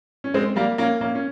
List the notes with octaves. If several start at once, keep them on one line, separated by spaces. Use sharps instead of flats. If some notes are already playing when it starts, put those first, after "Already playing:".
C#4
G#3 C4
G3 A#3
A#3 C#4
A#3 C#4
C#4